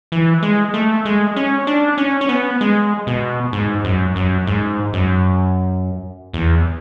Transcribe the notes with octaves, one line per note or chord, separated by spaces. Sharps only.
E3
G#3
A3
G#3
C#4
D4
C#4
C#4
B3
G#3
B2
G#2
F#2
F#2
G#2
F#2
E2